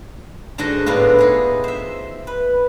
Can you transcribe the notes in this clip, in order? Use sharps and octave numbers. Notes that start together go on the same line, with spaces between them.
G#2 D3 D#4 F#4 D#5
A2 B3 D4 F4
D#4 G#4
C5 E5
B4